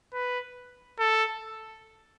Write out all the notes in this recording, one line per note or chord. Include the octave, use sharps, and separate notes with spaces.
B4
A4